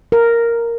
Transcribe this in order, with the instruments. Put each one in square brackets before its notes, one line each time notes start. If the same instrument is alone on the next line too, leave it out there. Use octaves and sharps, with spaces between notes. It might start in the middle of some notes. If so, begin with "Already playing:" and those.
[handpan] A#4